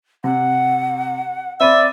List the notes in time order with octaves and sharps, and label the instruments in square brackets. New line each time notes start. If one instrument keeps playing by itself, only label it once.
[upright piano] C3 [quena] F#5
[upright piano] C4 B5 D#7 [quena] D5 [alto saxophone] E5